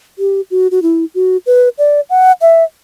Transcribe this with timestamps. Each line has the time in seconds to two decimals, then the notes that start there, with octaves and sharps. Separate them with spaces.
0.19 G4
0.51 F#4
0.71 F#4
0.82 E4
1.15 F#4
1.46 B4
1.78 D5
2.10 F#5
2.41 E5